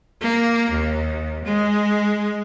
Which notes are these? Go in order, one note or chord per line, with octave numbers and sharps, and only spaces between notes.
A#3
D#2
G#3